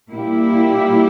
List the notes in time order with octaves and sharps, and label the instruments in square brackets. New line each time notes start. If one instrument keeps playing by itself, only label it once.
[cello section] A#2 G3 A#3 E4 G4